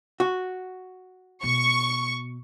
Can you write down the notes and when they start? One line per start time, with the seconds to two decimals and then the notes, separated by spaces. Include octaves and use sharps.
0.20 F#4
1.43 B2 C#6